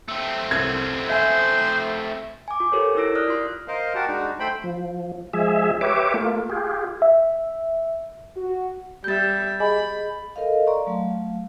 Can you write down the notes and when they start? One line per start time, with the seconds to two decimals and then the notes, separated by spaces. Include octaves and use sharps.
0.08 A3 C4
0.51 C2 G#6
1.09 C5 E5 G#5
2.48 G#5 D6
2.60 F4
2.72 F4 G4 A4 A#4 C5 C#5
2.95 D#4 E4 A#4 E6 A#6 D7
3.15 D5 D#6 F6 F#6
3.28 F4 C6
3.68 A#4 C5 D#5 F5
3.95 F#4 G4 A#4 F#5 A5
4.07 G#3 D4 D#4 F#4
4.40 A3 C5 G5 B5
4.64 F3
5.33 F3 G#3 G#4 E5
5.81 G4 B4 C#5 E5 D6
6.14 A3 A#3 F4
6.49 F4 G4 G#4
7.02 E5
8.36 F#4
9.04 G3 E5 G6 A6
9.60 G#4 D#5 G#5 B5
10.36 A4 A#4 D#5 F5
10.67 D5 A#5 C6 C#6
10.87 F#3 A3 F5